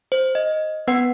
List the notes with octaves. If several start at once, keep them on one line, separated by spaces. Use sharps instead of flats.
C5
D#5
B3 B4 F#5 C7